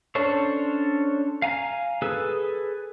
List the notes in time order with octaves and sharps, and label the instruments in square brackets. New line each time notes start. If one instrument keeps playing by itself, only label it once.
[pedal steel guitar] C#4 D4 A4 C5 C#5
F5 G#5 A#5
G#4 A4 B4